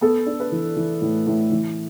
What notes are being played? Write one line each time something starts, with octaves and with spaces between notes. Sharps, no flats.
B3 A4
D4
B4
E3
E3
A2
A2
E3